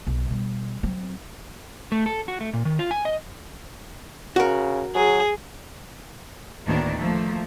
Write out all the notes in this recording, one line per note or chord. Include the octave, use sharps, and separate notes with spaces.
B1
B2 G3
F#3 C4
A3
A4
F#4
A3
A#2
D#3
F4
G#5
D#5
C#3 F#4 A#4
F#3 G#4
D2 A2 D#3 A#3 B3 D4
F3 A3 A#3